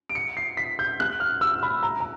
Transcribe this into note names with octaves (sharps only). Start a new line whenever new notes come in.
D7
C#7
C7
B6
G6
F#6
F6
E6
B5
A#5
A#5